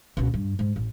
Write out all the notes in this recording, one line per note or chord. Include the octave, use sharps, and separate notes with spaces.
C#2 B2
G2
G#2
A1